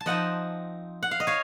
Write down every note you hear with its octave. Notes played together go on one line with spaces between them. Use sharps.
A5
F3 C4 D#4 D#5 F#5
F#5
F5
D#5
C#5 F5